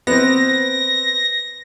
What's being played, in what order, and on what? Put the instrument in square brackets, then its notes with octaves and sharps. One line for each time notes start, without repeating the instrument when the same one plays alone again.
[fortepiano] B3 C4 [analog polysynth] A#6